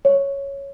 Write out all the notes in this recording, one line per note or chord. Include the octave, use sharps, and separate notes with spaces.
C#5